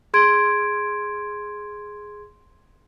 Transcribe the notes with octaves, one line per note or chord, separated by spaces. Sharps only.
G#4 C6 G#6 D7